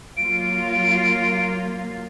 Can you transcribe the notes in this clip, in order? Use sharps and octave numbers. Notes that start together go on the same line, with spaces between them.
F#3 A#3 F4 D7